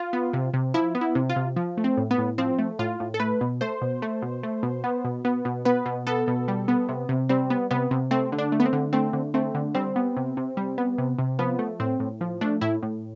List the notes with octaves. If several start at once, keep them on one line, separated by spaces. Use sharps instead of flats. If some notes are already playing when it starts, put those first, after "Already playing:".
Already playing: F4
B3
C3
C3
F3 E4
B3
E4
C3
F4
C3
F3
A3
C4
A2
B3
A2
F3 C4
A3
A2 F4
A2
A4
A3 B4
B2
A3 C5
B2
A3
B2
A3
B2
B3
B2
B3
B2
B3 B4
B2
B3 A4
B2
G3
B3
C3
C3
G3 C4
B3
C3 B3
C3
A3 C4
D3
D4
A3
B3
C4
D3
A3 C4
D3
A3 C4
D3
G3 C4
B3
C3
C3
G3
B3
C3
C3
F3 B3
A3
A2 C4
A2
F3
A3 D4
A2 E4
A2